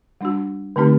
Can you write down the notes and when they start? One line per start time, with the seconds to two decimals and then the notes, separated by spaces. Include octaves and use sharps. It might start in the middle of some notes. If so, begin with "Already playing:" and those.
0.21 G3 D4 F#4
0.76 D3 A3 C4 D#4 G4